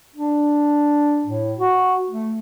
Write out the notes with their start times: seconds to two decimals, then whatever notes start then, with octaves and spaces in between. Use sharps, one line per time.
0.16 D4
1.26 A2
1.58 F#4
2.10 A3